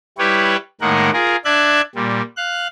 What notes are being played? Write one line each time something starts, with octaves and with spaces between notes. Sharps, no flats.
G3 E4 G4 B4 C#5
A2 D#3 G#3 A#3 A#4 F#5
F4 G#4 A#4
D4 D5 E5 F#6 G#6
A#2 G3
F5 F#6